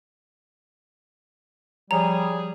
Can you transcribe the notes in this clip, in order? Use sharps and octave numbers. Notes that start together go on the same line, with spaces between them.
F3 G3 G#4 C#5 A#5